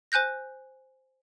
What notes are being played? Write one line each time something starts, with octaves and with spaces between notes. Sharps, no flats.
C5 G#5 F#6 G6 A#6